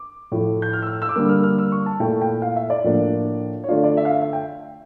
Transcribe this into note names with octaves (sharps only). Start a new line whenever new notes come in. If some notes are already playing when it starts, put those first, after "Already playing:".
Already playing: D6
A2 F3 A3 E4
G6
F6
E6
F6
E6
D6
D3 G3 A#3 E6
F6
F6
E6
C#6
A5
A#2 A3 E4 G5
G5
F5
E5
D5
A2 F3 A#3 D4
C#5
D3 A3 D4 F4 D5
D5
E5
F5
E5
E5
G5